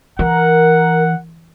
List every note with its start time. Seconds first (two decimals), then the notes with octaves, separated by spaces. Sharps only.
0.19 E3 A#4 F#5